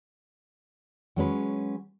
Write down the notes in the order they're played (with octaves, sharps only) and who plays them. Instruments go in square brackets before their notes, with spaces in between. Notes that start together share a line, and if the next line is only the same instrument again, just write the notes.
[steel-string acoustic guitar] F#3 G#3 C#4 B4